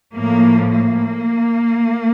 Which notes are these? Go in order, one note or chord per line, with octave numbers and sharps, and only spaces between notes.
A2 F3 A#3
A#3